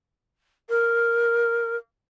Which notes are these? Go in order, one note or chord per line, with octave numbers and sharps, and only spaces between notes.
A#4